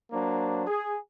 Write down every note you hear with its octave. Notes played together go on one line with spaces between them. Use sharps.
F#3 A#3 D4 C5
G#4